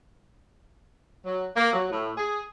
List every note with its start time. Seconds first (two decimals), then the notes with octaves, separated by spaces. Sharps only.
1.25 F#3
1.56 A#3
1.73 F#3
1.90 A2
2.17 G#4